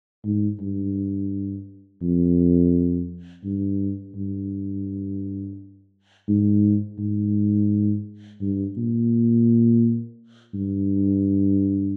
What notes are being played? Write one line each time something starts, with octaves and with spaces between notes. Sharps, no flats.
G#2
G2
F2
G2
G2
G#2
G#2
G2
A#2
G2